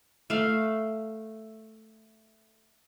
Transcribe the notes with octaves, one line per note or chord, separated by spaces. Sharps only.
A3 F5